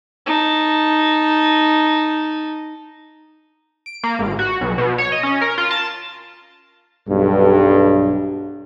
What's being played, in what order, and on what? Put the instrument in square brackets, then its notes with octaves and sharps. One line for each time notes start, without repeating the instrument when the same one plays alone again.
[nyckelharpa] D#4 A5
[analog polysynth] D7
A#3
G#1
F#4
B1
B2
C#5
D#5
C#4
A#4
F4
A5
[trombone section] B1 G2